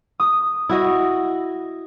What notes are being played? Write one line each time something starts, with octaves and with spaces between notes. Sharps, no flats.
D#6
E4 F#4 D#5